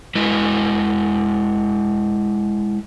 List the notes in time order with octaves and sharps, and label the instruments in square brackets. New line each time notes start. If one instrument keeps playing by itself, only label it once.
[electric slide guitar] G#3 E4 B4